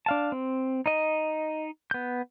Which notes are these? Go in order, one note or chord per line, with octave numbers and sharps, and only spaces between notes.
D4 F5 A5
C4
D#4 D#5
B3 G6